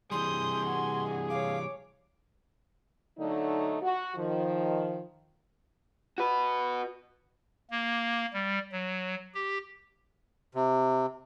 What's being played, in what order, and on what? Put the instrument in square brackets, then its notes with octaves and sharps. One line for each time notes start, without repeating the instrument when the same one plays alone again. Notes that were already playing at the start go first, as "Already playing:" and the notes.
[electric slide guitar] C3 E3 G3 [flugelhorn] G#4 [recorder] C6 [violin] D#6 G6
[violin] F#4 G#5
[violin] C#5 D6 [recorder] F5
[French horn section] D3 F#3 A3 D#4
F#4
D#3 F3
[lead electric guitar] F#4 B4
[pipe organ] A#3
G3
F#3
G4
[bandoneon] C3